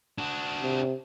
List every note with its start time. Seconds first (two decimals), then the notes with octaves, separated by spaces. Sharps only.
0.18 D4 F#4
0.62 C3